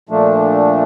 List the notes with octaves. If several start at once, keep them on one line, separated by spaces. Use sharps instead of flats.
A#2 F3 A3 D4